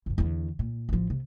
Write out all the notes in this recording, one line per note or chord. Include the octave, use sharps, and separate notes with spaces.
C2 F#2
E2 D3
A#2
A1 F3
C3